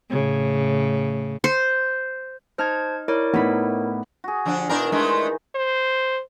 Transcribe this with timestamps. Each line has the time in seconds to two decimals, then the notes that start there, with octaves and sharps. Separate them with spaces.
0.10 A2 C#3
1.44 C5
2.58 D#4 C5 A5 F6 G#6
3.08 E4 A#4 C#5 D5
3.34 A2 B3 D#4 B5
4.24 F#4 G#4
4.45 D3 F3 D4
4.69 B2 D#3 E3 D4 D#4 A#4
4.92 G#3 A3 D4
5.55 C5